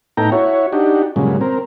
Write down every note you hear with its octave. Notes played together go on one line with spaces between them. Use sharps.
A2 B3 D#4 A4 G5 A#5
E4 F#4 C#5
D4 D#4 F#4 G4
G2 A#2 C#3 F#3 G#3
C4 A#4